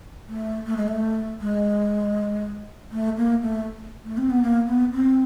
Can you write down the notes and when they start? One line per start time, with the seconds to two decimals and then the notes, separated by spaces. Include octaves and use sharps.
0.29 A3
0.66 A3
0.77 G#3
0.88 A3
1.41 G#3
2.92 A3
3.17 A#3
3.42 A3
4.05 A3
4.18 C4
4.30 B3
4.42 A#3
4.68 B3
4.93 C4